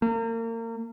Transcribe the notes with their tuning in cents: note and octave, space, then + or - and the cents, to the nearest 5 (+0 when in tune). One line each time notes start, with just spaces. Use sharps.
A#3 -35